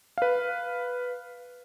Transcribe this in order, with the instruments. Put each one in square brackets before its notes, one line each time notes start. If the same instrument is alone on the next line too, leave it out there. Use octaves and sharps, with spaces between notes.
[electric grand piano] B4 F5